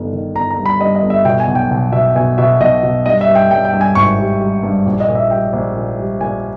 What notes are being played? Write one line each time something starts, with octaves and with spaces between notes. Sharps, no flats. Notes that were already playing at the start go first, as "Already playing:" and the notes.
Already playing: G1 D#3 G3
D#3
G1 A#5
A#5
G2
B5
G2 D#5
D#5
G1
E5
B2 G5
G#5
B1
G5
B1
B2 E5
B2 G#5
B2 E5
B1 D#5
B2
G2 D#5
E5
G2
G5
G2 G5
G5
G2
G#5
G#1 C#6
G3
G3
G2
A#1
D#5
A#2
E5
G3 G5
A#1
A#2
G3
A#2 G#5